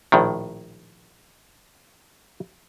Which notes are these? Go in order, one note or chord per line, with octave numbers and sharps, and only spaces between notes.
A#1 A2 D#3